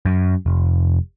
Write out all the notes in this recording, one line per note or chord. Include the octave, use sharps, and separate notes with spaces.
F#2
F1